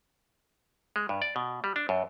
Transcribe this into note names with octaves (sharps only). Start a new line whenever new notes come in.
G#3
G2
D5
B2
G3
D4
F#2